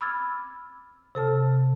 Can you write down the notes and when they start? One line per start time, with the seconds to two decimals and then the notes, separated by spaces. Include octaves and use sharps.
0.01 B5 D6 E6 F6 G#6 A6
1.15 C3 A4 A5 F6